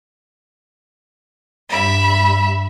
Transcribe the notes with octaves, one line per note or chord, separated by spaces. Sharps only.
G2 E5 B5